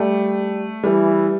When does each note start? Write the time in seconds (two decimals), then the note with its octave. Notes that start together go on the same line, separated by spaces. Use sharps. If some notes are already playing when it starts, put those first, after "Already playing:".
Already playing: G3 A3
0.84 E3 G3